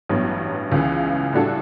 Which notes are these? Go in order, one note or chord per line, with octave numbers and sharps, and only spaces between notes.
A1 G2 F#3 B3
C#2 C#3 E3
A2 G3 D4 F#4 A4